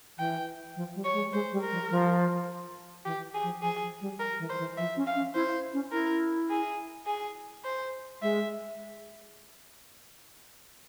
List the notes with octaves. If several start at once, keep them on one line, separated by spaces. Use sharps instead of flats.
E3 G5
F3
G3
C#5
G#3
G#3 C5
G3
A#4
F3
F3
E3 G4
G#4
F3
F3 G#4
F3
G3
A#4
E3
C5
E3
F3 E5
C#4
F5
C#4
E4 C5
C#4
E4 A#4
G#4
G#4
C5
G#3 E5